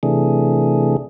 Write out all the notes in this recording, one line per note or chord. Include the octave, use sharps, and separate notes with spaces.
C3 E3 A3 D4 G#4